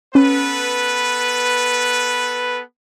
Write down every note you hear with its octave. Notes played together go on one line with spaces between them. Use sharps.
B3 C#4 A4 B4